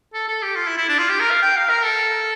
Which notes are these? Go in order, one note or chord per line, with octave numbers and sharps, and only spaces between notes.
A4
A4
G4
F4
E4
E4
D4
F4
G4
A#4
F5
G5
F5
A#4
A4